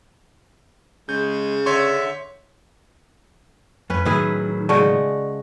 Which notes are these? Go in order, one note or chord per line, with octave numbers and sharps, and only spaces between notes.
C#3 G#3 G6
D3 C#5 E5 C6 C#6
F2 C#4 B4
A2 D#3 F#3 E4 G#4 B4
C#3 G#3 F#4 D5 A5 C#6